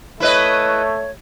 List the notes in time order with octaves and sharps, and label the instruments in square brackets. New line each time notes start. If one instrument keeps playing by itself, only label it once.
[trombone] A3 [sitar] E4 B4 D#5 [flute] C#5